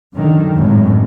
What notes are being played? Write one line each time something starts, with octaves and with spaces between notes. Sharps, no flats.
F#2 D3 D#3
G#1 F#2 A2